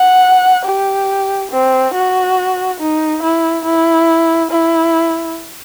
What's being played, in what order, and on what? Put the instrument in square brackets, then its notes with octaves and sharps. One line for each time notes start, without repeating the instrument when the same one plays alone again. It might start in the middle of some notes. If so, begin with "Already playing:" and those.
Already playing: [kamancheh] F#5
G4
C4
F#4
D#4
E4
E4
E4